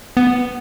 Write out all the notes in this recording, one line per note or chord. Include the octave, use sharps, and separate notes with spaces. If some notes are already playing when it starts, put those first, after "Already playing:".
B3